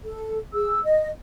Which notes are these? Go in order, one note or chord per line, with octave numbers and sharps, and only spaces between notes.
A4
G#4 E6
D#5